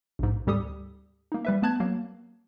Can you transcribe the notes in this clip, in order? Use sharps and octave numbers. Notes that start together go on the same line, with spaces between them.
A#1 G#2
D2 G#2 G3 G4 A4 D#6
A#3 D#4
G3 B4 E5
A3 B3 A5 F#6 G#6
F#3 A#3